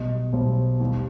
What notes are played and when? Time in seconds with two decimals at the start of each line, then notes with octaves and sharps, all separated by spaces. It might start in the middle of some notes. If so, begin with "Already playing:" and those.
Already playing: B1 B2 G3 D#5
0.33 B1 B2 G3 C5
0.80 D#2 D#3 G3